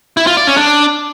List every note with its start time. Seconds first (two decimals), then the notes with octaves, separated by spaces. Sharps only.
0.17 E4
0.27 F4
0.37 D5
0.47 C#4
0.57 D4